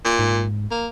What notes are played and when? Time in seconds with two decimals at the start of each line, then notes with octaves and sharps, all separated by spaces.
0.05 A#2
0.19 G#2
0.71 A#3